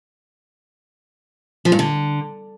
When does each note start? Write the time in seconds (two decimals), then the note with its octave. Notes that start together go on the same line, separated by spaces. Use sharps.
1.65 F3
1.72 G2
1.79 D3